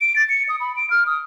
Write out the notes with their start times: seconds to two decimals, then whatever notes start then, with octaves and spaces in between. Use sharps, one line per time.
0.01 D7
0.16 A6
0.29 C#7
0.49 D#6
0.60 B5
0.77 D7
0.90 F6
1.06 D#6